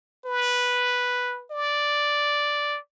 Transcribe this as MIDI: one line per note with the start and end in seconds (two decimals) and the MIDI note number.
0.26 1.45 71
1.51 2.78 74